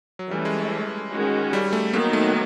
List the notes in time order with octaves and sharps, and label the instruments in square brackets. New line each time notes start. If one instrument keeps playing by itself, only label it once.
[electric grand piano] F#3
[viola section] E3 A3 C#4 [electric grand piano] G3
[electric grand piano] G#3
[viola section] D#3 G#3 C#4 F#4
[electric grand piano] G3
A3
[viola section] D#3 F#3 B3 [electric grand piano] A#3
[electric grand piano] A3